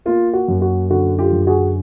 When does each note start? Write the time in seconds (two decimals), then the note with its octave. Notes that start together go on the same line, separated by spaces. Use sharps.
0.06 A#3 F4
0.33 F#4
0.48 F#2
0.62 F#4
0.90 D3 F#4
1.19 F4 G4
1.33 F#2
1.47 F#4 G#4